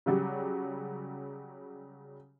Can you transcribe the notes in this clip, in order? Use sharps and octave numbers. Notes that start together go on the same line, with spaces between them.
C#3 F#3 G3